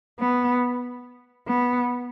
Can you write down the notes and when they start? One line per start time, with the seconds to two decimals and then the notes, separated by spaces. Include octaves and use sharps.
0.20 B3
1.47 B3